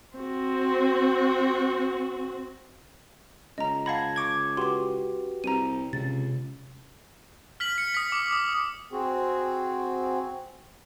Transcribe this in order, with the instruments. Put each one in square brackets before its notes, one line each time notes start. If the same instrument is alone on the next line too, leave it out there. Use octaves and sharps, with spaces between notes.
[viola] C4 F#4
[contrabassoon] C#2 [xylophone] D#5 A#5
[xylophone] F5 F#5 B5 [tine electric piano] A5 G#6 A#6
[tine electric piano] C#6 D6 G#6
[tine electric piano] F#4 G4 B4 [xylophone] C6 D6
[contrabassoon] C2 [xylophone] A#5 D#7
[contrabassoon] C#2 [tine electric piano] C3 [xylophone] A6
[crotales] F6 B6 F#7
C#7
D#6 B6
D6
D#6
[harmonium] C4 F#4 G#4